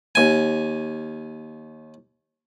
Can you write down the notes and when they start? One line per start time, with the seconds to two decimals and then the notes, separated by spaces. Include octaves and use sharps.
0.15 D#2 G#5